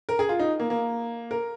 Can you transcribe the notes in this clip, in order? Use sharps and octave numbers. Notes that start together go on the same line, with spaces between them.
A#4
G#4
F4
D#4
A#3
A#3
A#4